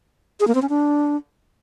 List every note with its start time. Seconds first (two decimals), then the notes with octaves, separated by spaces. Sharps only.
0.40 G#4
0.48 A#3
0.55 C4
0.62 C#4
0.69 D4